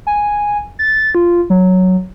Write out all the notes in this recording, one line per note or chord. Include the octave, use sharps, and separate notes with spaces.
G#5
A6
F4
F#3